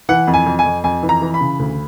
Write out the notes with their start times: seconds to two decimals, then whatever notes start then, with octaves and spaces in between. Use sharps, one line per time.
0.09 E3 F#5
0.27 F2
0.34 G#5
0.46 F2
0.59 G#5
0.65 F2
0.84 F2 G#5
1.03 E3
1.09 A#5
1.22 E3
1.34 B5
1.41 C#3
1.59 D2